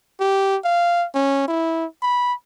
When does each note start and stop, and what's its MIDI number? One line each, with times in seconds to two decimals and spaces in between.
0.20 0.57 67
0.64 1.06 77
1.14 1.43 61
1.48 1.85 64
2.03 2.33 83